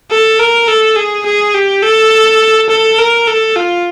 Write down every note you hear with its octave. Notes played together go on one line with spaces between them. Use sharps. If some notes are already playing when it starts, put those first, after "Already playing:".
A4
A#4
A4
G#4
G#4
G4
A4
A4
A#4
A4
F4